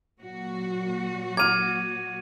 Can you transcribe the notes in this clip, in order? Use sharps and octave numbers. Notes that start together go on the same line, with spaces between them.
A#2 F#3 F#4
D6 F6 G#6 D#7